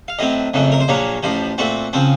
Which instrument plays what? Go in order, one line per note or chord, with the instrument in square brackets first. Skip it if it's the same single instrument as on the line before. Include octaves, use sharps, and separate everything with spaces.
[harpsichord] F5
A2 F#3 C4 D#5
F2 C#3 F#3 A3
A#4
C5
A#1 A#2 F#3 A#3 C#5
A1 A2 F3 C5
A#2 A3 C4 F#4
C#3 F3 C4